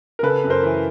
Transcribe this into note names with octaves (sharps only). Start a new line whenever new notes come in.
A#4
C#3 A4 B4
F#2
A#4 C5
E3